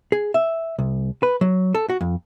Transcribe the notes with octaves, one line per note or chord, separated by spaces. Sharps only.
G#4
E5
C2
B4
F#3
A4
F#4
F2